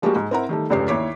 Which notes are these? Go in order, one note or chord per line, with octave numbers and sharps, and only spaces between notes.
F3 G3 G#3 A#3 F#4 G4
G#2
C4 E4 A#4 F#5 A#5
D#3 G3 A3
F1 C#2 G2 G4 C#5 C7
D#2 E4 C#5 D6 B6